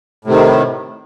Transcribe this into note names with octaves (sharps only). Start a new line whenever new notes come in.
A2 C3 D#3